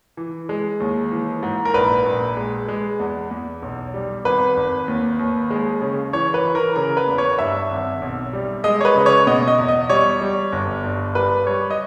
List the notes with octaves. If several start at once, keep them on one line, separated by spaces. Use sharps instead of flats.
E3
G#3
D#2
E3
G#2
A#4
A#1 B4
A#1
G#3
G#3
E2
E2
B1
G3
G#1 B4
G#1
D#2
D#2
G#3
C#3
E3 C#5
B4
E3
A#4
C#3 A#4
B4
E2
C#5
G2 E5
G#1
B1
G3
G#3 D#5
C#5
B4
C#3
C#5
B2 D#5
D#5
E2
D#5
G3 C#5
G3
G1
G2
G3 B4
G3 C#5
D#5